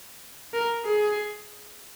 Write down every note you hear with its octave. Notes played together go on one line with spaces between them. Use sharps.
A#4
G#4